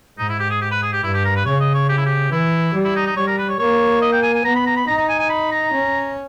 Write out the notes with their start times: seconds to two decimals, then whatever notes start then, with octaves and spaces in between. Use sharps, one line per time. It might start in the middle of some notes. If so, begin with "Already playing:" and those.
0.18 G#2 D#4
0.29 E4
0.40 G4
0.50 G#4
0.62 G4
0.71 B4
0.82 G#4
0.93 G4
1.03 G2 E4
1.14 G4
1.25 A#4
1.36 B4
1.46 C#3 C#5
1.60 D#5
1.74 C#5
1.89 G4
1.98 E4
2.06 G4
2.32 E3 E4
2.74 G3
2.85 E4
2.96 D#4
3.06 D#4
3.16 G3 C#5
3.27 A#4
3.38 B4
3.49 C#5
3.60 A#3 C#5
4.02 D#5
4.13 G5
4.23 G#5
4.34 G#5
4.45 B3 A#5
4.56 B5
4.67 A#5
4.77 B5
4.87 D#4 A#5
4.98 A#5
5.09 G#5
5.19 G#5
5.29 B5
5.51 A#5
5.72 C#4